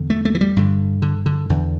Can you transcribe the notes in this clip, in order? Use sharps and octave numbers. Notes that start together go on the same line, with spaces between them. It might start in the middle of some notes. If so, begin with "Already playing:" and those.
Already playing: E2 D3
A3
A3
E3
G3
G2 D3
D3
D3
E2 D3